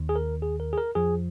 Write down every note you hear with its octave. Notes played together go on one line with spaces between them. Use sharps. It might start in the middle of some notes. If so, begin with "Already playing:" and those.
Already playing: D#2 D#3
G#4
A#4
G#4
A#4
G#4
A#4
F2 F3 G#4